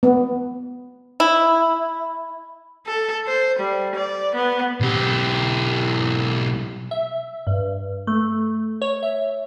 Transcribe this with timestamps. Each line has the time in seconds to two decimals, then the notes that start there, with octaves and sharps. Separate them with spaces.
0.03 B3
1.20 E4
2.87 A4
3.27 C5
3.59 G3
3.95 D5
4.35 B3
4.80 B1 G4
6.91 E5
7.47 G2
8.07 A3
8.82 C#5
9.03 E5